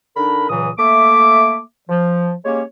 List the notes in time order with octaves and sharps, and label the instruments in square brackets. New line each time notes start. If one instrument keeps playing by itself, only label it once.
[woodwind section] D3 D4 D#4 A#4 B5
C#2 A#2 C#3 E3 F#3 D#6
A3 A#3 E5 D6
F3
G#3 A#3 C#4 G4 C#5